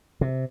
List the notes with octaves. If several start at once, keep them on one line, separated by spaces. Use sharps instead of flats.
C3